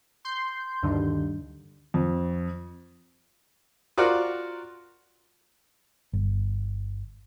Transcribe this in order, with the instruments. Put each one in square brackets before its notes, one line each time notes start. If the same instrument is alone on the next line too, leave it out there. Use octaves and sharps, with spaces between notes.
[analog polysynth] C6 G6
D2 G2 D3 D#3
[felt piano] F2
[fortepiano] F4 F#4 A#4 C5 D5 F#5
[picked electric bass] G1